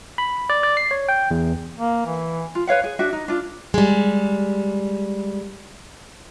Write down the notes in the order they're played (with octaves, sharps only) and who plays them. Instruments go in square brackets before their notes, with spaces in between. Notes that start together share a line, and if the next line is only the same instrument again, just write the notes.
[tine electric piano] B5
D5
D5
C7
C#5
G5
E2
[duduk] A#3
E3
[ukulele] F4
B4 C#5 F5 F#5
G#4
D4 F#4 E5
D#4
D4 F4
[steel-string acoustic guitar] G3 G#3